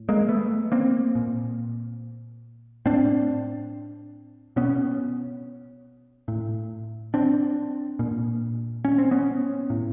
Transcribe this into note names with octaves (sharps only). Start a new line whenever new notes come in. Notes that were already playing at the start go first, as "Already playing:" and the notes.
Already playing: A2
G#3 A#3
A3 B3
A#3 C4
A#2
A2 C4 D4
B2 B3 C#4
A2
C4 D4
A#2
C#4
C4
B3 C#4
A2